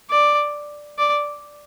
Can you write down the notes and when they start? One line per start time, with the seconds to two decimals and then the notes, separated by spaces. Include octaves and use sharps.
0.10 D5
0.98 D5